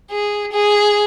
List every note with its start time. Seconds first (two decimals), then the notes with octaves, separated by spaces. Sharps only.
0.10 G#4
0.52 G#4